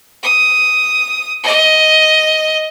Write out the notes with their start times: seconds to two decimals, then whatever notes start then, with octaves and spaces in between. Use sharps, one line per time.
0.23 D#6
1.44 D#5